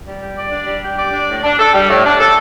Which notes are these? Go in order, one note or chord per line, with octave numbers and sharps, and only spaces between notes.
G3
G4
D5
D4
G3
G4
D5
D4
A2
D4
A4
G3
A2
D4
A4